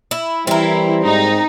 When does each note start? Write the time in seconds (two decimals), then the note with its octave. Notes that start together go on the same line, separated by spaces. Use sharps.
0.11 E4
0.47 E3 G3 C4 E4 A#4
1.05 G#2 D#4